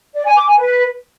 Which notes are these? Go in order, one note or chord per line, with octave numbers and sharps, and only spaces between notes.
D5
G#5
D6
G#5
B4